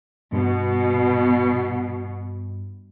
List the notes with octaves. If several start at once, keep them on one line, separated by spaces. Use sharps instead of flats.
G2 B2